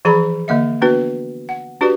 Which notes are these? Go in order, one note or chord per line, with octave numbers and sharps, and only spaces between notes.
E3 F3 G#4 D5 A#5 B5
D3 A#3 D#5 E5
B3 D4 F#4 B4
F#5
D4 F#4 G4 B4 D5